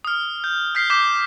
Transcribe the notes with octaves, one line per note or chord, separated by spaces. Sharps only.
D#6 F6
G6
F6 G6 B6 C7
D6 G6 B6 E7